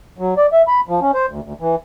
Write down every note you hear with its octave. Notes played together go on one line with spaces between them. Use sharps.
F#3
D5
E5
B5
F3
C#4
C5
D2
D2
E3